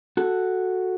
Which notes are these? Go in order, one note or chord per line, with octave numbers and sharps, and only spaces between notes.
F#4 A4